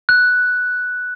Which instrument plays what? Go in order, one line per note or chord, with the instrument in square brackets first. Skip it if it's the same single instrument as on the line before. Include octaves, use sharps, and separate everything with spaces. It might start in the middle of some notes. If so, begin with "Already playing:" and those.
[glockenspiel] F#6